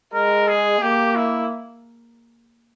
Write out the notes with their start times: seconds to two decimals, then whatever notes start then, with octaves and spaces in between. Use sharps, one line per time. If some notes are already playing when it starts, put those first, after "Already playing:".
0.14 G#3 A#4
0.48 G#4
0.82 A#3 G4
1.16 E4